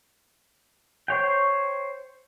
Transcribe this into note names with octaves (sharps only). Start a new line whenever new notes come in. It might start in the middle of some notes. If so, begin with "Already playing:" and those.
C5 C#5 G5